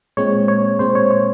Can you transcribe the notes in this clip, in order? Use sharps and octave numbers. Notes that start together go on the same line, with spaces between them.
A#2 G#3 C4 C#5
C#5
A#2 G#3 C4 C5
C#5
C#5